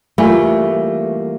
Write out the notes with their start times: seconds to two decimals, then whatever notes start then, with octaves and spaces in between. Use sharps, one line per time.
0.18 E3 G3 A3 A#3 F4 G#5 B5